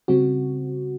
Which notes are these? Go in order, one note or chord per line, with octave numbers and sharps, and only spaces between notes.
C#3 G3 C4 F#4